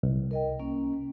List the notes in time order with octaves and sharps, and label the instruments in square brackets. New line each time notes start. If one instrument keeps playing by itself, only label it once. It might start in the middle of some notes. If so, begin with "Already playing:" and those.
[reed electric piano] C2
[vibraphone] A#4 D#5 G5
A#3 C#4